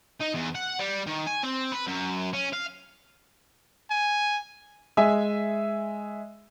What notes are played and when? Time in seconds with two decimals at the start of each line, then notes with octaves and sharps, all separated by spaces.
0.21 D#4
0.35 E2
0.56 F#5
0.80 G3
1.06 D#3
1.27 G#5
1.43 C4
1.72 B4
1.87 F#2
2.34 C#4
2.53 F5
3.90 G#5
4.97 G#3 E5 G#5